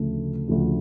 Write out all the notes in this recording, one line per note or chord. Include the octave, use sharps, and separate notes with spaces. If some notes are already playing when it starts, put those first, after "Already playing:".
Already playing: D2 C#3 F3 A3
D2 C#3 F3 A3